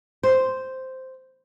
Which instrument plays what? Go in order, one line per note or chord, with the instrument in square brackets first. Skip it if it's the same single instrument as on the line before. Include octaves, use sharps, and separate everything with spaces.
[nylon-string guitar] C5